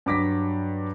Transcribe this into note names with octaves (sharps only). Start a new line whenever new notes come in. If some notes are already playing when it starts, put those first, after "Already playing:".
G2 F#3 D6 A#6 B6